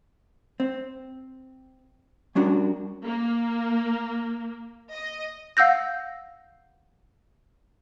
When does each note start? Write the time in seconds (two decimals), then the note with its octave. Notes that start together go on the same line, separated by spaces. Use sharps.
0.60 C4
2.35 G3 C#4 D4 F#4 A#4
3.05 A#3
4.93 D#5
5.57 F5 F#5 E6 G6 A#6